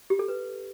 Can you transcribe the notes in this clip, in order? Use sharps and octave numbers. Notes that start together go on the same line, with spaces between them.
G4
A4
B4